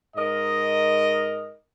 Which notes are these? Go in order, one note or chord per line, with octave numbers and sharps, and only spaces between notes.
G#2 A#4 D#5